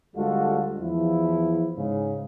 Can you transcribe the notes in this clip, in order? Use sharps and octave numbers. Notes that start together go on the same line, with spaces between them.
D2 G3 G#3 F4 F#4 A4
E2 F3 E4
G#2 C#3